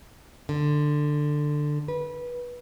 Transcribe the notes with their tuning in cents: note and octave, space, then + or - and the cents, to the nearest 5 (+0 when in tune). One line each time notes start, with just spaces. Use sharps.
D3 +15
B4 -20